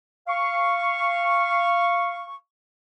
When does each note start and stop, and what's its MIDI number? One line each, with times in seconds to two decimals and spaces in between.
0.27 2.35 77
0.27 2.35 85